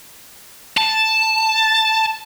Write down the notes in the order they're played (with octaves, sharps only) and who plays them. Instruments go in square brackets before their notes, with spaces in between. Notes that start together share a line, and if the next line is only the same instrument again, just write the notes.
[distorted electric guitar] A5